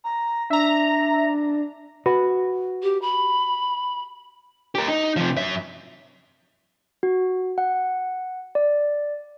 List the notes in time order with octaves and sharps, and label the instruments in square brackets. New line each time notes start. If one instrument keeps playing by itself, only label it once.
[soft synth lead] A#5
[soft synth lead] D4 [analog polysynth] E5 A#5
[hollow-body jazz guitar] F#4 B4
[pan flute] G4
B5
[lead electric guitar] G4 A#4
D#4
C3 F3
F#2 E5
[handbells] F#4
F#5
D5